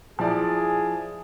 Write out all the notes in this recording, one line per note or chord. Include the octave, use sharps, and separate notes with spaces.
F3 E4 G#4 D5